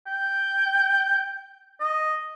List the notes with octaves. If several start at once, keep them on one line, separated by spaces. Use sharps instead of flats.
G5
D#5